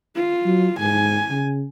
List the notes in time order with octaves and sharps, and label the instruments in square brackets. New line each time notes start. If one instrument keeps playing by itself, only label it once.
[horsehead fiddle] F4
[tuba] F#3
[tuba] G#2 [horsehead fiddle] G#5
[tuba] C#3